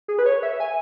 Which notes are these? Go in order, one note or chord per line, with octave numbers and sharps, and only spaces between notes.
G#4
B4
C#5
E5
G#5